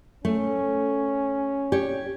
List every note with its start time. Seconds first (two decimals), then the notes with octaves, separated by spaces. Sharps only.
0.25 A3 C#4
1.72 G4 C#5